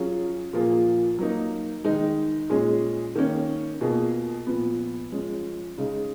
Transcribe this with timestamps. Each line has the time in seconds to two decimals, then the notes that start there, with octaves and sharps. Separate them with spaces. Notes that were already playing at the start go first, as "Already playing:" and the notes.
Already playing: F#3 C#4 F4 G#4
0.53 A#2 F3 A#3 F4 G#4
1.19 F#3 A#3 D#4
1.84 D#3 G#3 D#4
2.50 A#2 G#3 C#4 G#4
3.15 D#3 A#3 C#4
3.81 B2 A#3 F4 G#4
4.47 A#2 F3 B3
5.12 F3 G#3 C#4
5.78 C#3 G#3 D#4 G#4